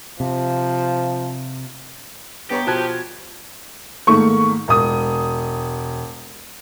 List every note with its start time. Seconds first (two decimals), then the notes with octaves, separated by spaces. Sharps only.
0.20 C3 F3
2.50 G2 B3 G4 C#5 A#5
2.67 B2 F3 A5 F#6 G#6
4.07 G#2 D#3 A3 A#3 C#6
4.68 E1 D#6